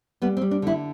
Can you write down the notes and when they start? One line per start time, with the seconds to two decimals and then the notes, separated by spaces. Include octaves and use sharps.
0.22 G3 B3
0.37 C4
0.42 G3
0.51 D4
0.62 D3 E4